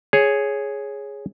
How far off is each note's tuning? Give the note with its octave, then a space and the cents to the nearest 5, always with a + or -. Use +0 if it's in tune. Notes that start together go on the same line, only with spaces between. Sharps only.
G#4 +0 C#5 +0